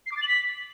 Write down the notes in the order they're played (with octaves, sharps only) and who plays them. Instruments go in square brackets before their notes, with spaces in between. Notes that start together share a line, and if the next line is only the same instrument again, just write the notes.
[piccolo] C7
D6
A6
F#7
B6